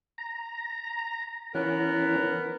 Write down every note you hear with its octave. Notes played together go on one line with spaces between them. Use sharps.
A#5
E3 B3 C#4 A#4